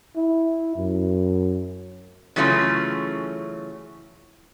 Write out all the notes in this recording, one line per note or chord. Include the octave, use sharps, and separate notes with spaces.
E4
F#2
C#3 E3 F#3 A3 C#4 F4